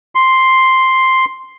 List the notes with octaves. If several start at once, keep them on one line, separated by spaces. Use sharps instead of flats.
C6